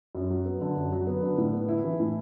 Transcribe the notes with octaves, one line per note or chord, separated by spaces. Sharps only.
F#2
F#3
B3
D3
F#2
F#3
B3
D3
A2
B3
E4
E3
A2